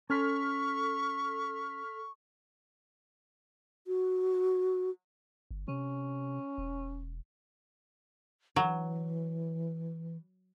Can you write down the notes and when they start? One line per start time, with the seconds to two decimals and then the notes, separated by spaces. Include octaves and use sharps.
0.10 C#4 A4 C6 C#6 F6 B6
3.87 F#4
5.51 G1
5.68 C3 C#4
6.58 E1
8.56 E3 F#3